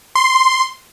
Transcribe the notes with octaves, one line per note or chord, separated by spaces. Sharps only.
C6